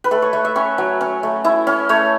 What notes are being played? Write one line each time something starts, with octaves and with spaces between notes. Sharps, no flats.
B4
A3 A4
C#5
A3
E5
C#4 C#5
F#3
C#4
A3
E4 E5
C#4
A3 C#5